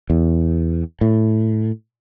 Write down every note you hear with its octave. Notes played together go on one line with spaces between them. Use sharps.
E2
A2